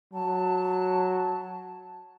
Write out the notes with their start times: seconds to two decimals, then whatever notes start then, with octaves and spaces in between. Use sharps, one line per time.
0.14 F#3 A5